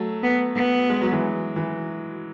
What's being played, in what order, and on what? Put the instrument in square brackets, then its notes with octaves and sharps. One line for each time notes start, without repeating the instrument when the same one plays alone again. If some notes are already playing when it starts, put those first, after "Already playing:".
Already playing: [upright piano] F#3 A3
[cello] B3
B3
[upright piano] G#3
F#3
E3 G#3
E3